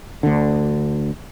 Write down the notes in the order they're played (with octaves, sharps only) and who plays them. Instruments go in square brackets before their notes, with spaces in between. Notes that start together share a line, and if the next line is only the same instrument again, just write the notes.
[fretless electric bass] D2 D3